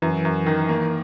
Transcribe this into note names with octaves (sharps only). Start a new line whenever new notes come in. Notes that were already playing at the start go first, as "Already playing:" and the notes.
F#2 E3
F#2
D#3
A#3